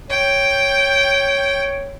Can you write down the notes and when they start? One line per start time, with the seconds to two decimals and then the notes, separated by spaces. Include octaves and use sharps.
0.10 C#5 G5